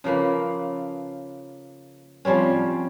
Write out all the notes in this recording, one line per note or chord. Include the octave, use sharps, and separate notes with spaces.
C#3 F3 A#3 B4
F3 G3 C4 C#4